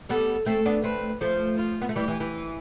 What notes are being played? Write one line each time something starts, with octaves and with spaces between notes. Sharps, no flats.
G3 B3 A4
A3 C4 A4
B3 D4
A3 C4 B4
F3 A3 C5
F4
B3
A3
E3 G3 G4
E3
E3